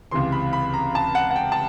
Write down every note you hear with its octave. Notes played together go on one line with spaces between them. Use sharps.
C#2 C3 E3 C6
B5
B5
A#5
A5
F#5
F#5
G5
A5